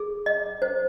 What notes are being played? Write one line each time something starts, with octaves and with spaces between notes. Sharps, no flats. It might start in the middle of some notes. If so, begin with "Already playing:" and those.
Already playing: G#4
D#5
C5